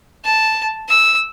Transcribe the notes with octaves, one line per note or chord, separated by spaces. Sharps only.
A5
E6